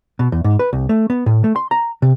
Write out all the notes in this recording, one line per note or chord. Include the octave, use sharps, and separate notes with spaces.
B2
E2
G#2
B4
C2
A3
B3
A2
A3
C6
A#5
C3